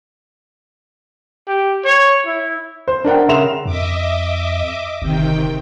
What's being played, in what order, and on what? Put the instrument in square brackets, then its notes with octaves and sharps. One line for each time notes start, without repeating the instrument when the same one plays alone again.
[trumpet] G4
C#5
E4
[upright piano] C5
D4 A#4 F#5 G5
C#3 A#4 E5 C6 E7 F7
[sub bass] F2 [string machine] D#5 E5 D6
[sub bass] G1 [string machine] C3 D#3 G5